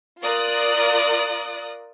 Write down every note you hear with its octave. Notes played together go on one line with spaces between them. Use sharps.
F4 A#4 D5 D#6 F#6